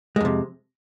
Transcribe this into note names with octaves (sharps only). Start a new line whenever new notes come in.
F2 C3 G#3